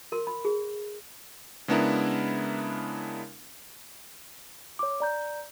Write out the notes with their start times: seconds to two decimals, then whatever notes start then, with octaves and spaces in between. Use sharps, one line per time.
0.12 A#4 C6
0.27 B5
0.45 G#4
1.68 C#3 G#3 B3 D4 E4 A#4
4.79 C#5 D6
5.00 D5 A#5 G6